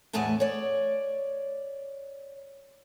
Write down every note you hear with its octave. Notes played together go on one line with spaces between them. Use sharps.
E2 A2 A3 B3 G#5 A5
C#5 D5